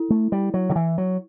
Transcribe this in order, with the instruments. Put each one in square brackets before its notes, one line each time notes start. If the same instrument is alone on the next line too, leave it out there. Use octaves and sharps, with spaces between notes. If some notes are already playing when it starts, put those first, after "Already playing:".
Already playing: [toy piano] E4 A4
[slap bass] A3
G3
F#3
D3
E3
F#3